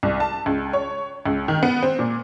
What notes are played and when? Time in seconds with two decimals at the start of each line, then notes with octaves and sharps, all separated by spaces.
0.03 C2
0.20 A5
0.46 C#2
0.73 C#5
1.26 C#2
1.48 D#3
1.63 B3
1.83 C4
1.99 A#2